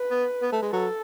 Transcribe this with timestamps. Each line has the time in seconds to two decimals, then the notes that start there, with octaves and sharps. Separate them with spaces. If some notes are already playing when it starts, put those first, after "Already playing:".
Already playing: B4
0.10 B3
0.42 B3
0.52 A3
0.62 G#3
0.73 F#3 A4